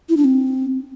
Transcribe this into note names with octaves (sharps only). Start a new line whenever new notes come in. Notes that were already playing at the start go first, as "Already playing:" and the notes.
E4
D4
C4